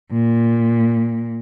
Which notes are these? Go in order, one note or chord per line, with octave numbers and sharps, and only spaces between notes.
A#2